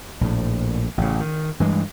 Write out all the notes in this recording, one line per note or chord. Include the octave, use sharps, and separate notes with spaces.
A#1 A2
A1 A2 C#3
D#3
G2 E3 G#3